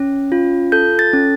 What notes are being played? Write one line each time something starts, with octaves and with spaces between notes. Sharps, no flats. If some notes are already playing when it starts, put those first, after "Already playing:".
Already playing: C#4
F4
A4 G6
A6
C#4